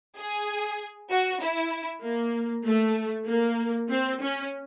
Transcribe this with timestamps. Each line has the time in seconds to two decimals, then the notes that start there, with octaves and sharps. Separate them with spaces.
0.16 G#4
1.10 F#4
1.41 E4
2.03 A#3
2.65 A3
3.28 A#3
3.90 C4
4.22 C#4